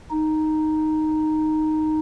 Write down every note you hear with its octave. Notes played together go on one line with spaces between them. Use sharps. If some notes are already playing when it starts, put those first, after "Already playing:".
D#4